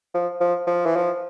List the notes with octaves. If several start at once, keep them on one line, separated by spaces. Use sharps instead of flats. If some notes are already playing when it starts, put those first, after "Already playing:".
F3
F3
F3
E3
F3